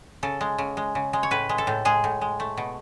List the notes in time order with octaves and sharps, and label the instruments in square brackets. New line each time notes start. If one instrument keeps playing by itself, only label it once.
[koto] C#3 A4
G#3
C#3
G#3
C#3
G#3
C#5
A2 B4
G#3
A4
A2
G#3 G#4
A2
G#3
A3
B2